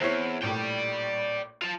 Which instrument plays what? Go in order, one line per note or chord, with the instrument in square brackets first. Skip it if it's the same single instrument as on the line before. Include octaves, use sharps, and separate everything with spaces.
[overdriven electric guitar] E2 [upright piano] C4 E4 C#5
[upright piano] A#1 A2 [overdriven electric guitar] D5 G5
[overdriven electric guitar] F4 A5